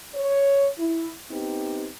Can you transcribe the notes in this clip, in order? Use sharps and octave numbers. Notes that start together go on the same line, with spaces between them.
C#5
E4
B3 C4 D#4 G4